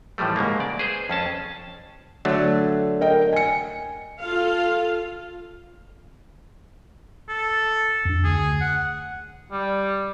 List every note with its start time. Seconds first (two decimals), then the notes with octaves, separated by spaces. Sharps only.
0.18 A2 E3 F3 G3 A3
0.36 G#2 C#3 G#3 A#3
0.60 D5
0.79 G#4 B4 C5
1.09 F2 C#4 A5
2.25 D3 F#3 A3
3.01 A#4 D#5 G5
3.33 G#5 C#7
4.20 F4 A4 F5
7.29 A4
8.05 F2 D4
8.24 D2 G#4
8.61 F#5
9.52 G3